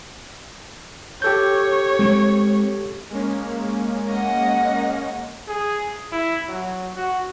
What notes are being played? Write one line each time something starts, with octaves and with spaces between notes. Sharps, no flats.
G4 A4 C#5 G6
G#3 C4
G#3 A#3 C#4
D#5 F#5
G#4
E4
F#3
F#4